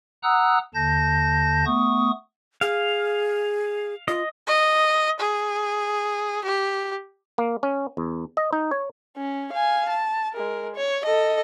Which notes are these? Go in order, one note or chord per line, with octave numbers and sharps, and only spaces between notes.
F#5 A#5 D#6 E6 F#6
D#2 D3 A5 G6 A#6
A3 B3 C#6 D#6
G#4 F5
F4 D#5
D#5
G#4
G4
A#3
C#4
E2
D#5
D#4
C#5
C#4
F5 G#5
A5
G#3 A#4
C#5
A4 D#5